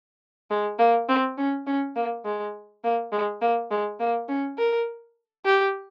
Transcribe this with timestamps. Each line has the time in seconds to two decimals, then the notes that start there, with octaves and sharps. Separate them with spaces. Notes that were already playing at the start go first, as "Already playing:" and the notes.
0.50 G#3
0.79 A#3
1.09 C4
1.38 C#4
1.67 C#4
1.96 A#3
2.25 G#3
2.84 A#3
3.12 G#3
3.41 A#3
3.71 G#3
4.00 A#3
4.29 C#4
4.58 A#4
5.46 G4